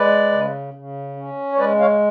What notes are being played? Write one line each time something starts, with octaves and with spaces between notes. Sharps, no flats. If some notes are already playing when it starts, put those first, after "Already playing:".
Already playing: G#3 B4 D5
C#3
C#3
C#4
C#5
G#3 B4 D5
C#5 F5